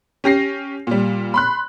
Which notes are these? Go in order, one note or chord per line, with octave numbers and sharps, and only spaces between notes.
C#4 G4 A#6 C7
A#2 G3
B5 C6 F#6